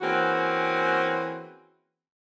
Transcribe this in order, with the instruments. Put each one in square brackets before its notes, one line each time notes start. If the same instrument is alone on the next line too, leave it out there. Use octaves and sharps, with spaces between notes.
[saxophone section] E3 A#3 C4 C#4 F#4 G#4